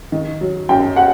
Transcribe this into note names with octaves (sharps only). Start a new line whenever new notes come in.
D#3
F#3
F#2 G5
F#5